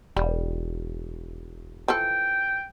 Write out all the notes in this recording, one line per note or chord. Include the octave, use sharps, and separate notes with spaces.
E1 G3
E3 F3 A4 G5